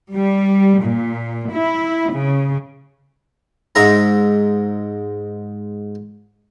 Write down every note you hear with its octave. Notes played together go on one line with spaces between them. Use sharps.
G3
A#2
E4
C#3
G#2 E5 A#5